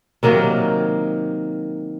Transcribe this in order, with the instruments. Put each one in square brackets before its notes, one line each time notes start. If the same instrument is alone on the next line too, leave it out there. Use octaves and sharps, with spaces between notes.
[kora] C3 D#3 F#3 A#3